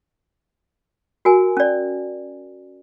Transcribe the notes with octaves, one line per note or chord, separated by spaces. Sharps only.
F#4 A#4 G#5
C#4 D5